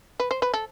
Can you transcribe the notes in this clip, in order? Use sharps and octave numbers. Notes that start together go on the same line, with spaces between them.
B4
C5
B4
A4